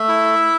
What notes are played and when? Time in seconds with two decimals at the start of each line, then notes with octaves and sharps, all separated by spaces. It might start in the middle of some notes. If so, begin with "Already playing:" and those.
Already playing: A3 E5
0.08 E4